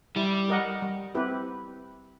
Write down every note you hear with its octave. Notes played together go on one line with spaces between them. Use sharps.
G3 E4
G4 A#4 D#5 F#5
G3
C4 E4 G4 B4